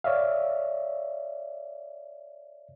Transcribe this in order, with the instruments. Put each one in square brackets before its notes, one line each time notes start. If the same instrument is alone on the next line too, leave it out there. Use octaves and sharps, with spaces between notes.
[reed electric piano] C#5 D5 E5 F5